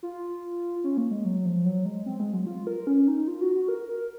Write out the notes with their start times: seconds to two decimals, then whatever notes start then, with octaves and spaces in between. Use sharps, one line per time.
0.03 F4
0.84 C#4
0.97 A#3
1.11 G#3
1.25 F#3
1.45 F3
1.65 F#3
1.85 G#3
2.06 C4
2.20 G#3
2.33 F#3
2.47 F4
2.67 A#4
2.87 C#4
3.08 D#4
3.28 F4
3.41 F#4
3.55 F#4
3.69 A#4
3.88 A#4